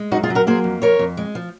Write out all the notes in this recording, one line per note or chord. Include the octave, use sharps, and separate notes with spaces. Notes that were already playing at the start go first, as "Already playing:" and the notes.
Already playing: G#3
F#2 D#4 F#4
F4 G#4
F#3
F#4 A#4
A#3 G#4 C5
F2
F2 A#4 C#5
F2
G#3
F3